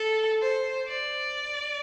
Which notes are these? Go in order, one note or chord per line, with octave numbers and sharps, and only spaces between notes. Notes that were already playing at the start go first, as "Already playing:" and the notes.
Already playing: A4
C5
D5